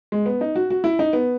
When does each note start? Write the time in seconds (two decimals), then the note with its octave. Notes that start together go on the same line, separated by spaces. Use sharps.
0.12 G#3
0.26 B3
0.41 D#4
0.56 F#4
0.70 F#4
0.84 E4
0.99 D#4
1.13 B3